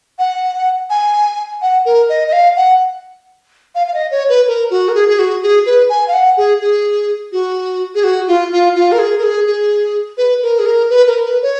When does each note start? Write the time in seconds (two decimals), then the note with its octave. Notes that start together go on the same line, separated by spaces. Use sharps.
0.19 F#5
0.90 G#5
1.62 F#5
1.85 A#4
2.09 D#5
2.28 D#5
2.33 F5
2.56 F#5
3.75 F5
3.87 F5
3.94 D#5
4.11 C#5
4.29 B4
4.47 A#4
4.70 F#4
4.89 A#4
4.95 G#4
5.09 G#4
5.19 F#4
5.43 G#4
5.66 B4
5.89 G#5
6.08 F5
6.13 F#5
6.37 G#4
6.61 G#4
7.32 F#4
7.95 G#4
8.04 F#4
8.28 F4
8.52 F4
8.75 F4
8.92 A#4
8.99 G#4
9.18 A#4
9.23 G#4
9.47 G#4
10.18 B4
10.42 A#4
10.59 G#4
10.66 A#4
10.90 B4
11.07 A#4
11.25 B4
11.42 C#5